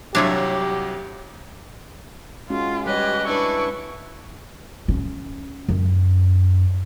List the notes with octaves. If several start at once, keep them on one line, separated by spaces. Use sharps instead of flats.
C2 F#3 D4 E4 F4 G4 C#5
G#3 C#4 F4 F#4
G3 G4 B4 C#5 D#5
D4 E4 B4 C#6
C#4
F#2